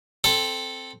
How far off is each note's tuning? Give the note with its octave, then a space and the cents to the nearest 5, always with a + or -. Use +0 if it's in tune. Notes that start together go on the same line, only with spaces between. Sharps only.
C4 +0 A4 +0